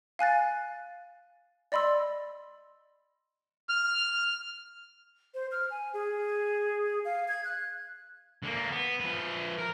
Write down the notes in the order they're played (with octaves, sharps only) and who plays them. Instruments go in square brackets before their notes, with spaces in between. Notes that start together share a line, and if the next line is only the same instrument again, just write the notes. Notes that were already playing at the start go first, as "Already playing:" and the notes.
[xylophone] F5 G#5 F#6 A6
D5 D#5 B5 C6 E6
[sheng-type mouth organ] F6
[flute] C5
F6
G#5
G#4
F5
G#6
F#6
[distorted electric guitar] D3 A#3
B3
F3 B4
A#4